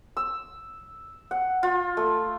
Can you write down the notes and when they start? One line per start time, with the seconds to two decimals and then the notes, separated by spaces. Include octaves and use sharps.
0.17 E6
1.31 F#5
1.63 F4
1.97 A3